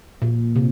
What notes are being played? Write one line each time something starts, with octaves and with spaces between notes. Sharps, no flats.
A#2
C3